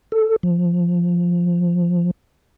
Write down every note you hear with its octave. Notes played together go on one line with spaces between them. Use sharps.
A4
F3